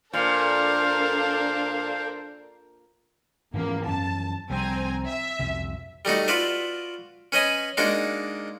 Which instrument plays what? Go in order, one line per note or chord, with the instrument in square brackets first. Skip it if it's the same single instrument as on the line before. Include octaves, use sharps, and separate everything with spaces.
[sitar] A#2 [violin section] D4 A4 A#4 [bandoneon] C5 [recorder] F5
[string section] E2 F3 A#3 [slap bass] G#2 E3 C#4
[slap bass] F#2 E3 C#4 [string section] A5
[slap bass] C2 F3 G3 [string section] C4 G#5 A#5
[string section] E5
[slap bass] C2 F2 B2
[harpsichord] G3 A3 D#4 F#4
F4 F#4 B4 D5 E5
C#4 B4 D#5 G#5
G#3 A#3 D4 D#4 F#4